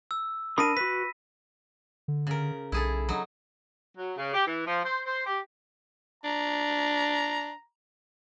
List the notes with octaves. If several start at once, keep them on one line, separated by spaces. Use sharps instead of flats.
E6
D4 A#4 B5 D#6 A#6 D#7
F#4 B4 B6
D3
C#3 A#4
B1 E4 G#4 A4
F#3 D#4
F#3
C#3
G4
E3
F3
C5
C5
G4
D4 A#5